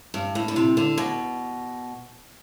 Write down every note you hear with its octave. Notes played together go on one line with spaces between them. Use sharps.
G2
A2
D3
C3
D3
B2